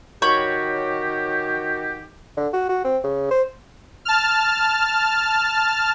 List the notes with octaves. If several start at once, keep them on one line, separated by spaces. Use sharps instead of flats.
D#3 F#4 G4 C#5 B5 G6
D3
F#4
F#4
C4
C#3
C5
A5 F6